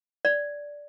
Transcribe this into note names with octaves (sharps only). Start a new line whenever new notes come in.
D5